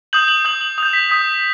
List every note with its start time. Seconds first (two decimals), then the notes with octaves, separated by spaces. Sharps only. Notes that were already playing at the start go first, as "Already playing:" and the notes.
0.13 D#6 G6 F#7
0.28 F#7
0.45 D#6 G6 F#7
0.61 F#7
0.78 D#6 G6 F7
0.93 B6
1.10 D#6 G6 B6